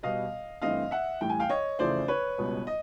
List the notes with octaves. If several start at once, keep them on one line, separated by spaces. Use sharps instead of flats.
B2 G3 B3 D#5 F5
G2 E3 A3 C4 D#5 F5
E5 F#5
A2 E3 G3 G5
G#5
F5 G5
C#5 D#5
F2 C#3 E3 A3 C5 D5
B4 C#5
C#2 B2 G3 B3
D#5